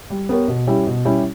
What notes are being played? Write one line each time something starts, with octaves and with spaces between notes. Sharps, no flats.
G3
B3 G4 A#4 C#5
B2
G3 C#4 E4 G4
B2
G3 C#4 E4 G4